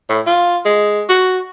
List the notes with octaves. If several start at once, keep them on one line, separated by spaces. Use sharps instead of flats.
A2
F4
G#3
F#4